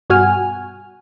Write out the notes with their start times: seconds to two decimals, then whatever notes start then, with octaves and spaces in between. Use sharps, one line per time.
0.10 G2 B2 F#4 G#5 F6